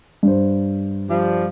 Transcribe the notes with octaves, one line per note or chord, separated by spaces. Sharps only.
G2 C5
F3 G3